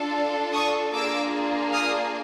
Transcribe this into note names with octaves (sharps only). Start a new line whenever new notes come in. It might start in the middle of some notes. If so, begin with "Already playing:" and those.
Already playing: D4 F4 A4
C#6 D#6
A#3 D4 F4 G#4 D6 E6
D#6 F6